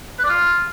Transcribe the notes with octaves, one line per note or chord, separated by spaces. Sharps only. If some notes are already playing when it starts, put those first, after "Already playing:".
B4
D5
F4